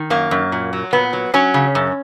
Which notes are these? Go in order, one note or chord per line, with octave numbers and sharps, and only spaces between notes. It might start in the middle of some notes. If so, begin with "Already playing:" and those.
Already playing: D#3
F#2 A#3
F#2
A#2
F#3
A#2 B3
F#3
F#3 C#4
C#3
F#2